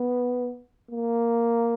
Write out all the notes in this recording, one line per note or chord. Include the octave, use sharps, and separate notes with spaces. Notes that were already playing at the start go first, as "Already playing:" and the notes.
Already playing: B3
A#3